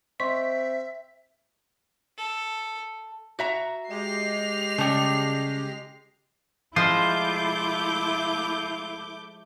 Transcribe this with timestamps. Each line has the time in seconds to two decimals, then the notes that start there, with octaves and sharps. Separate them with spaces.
0.20 C4 D#5 E5 C6 C#6 B6
2.18 A4
3.39 F#4 E5 A#5
3.90 G#3 G4 D#5 C7 F7
4.78 C#3 G3 A3
6.76 F3 G#3 A3 E4 F4 C5 D6 G6